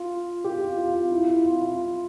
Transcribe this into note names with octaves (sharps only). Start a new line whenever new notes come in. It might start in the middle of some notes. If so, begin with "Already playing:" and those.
Already playing: F4
G4
F4
F4
F4
E4
E4
F4
F4